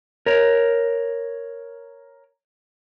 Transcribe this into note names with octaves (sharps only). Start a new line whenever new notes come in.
A#4 C#5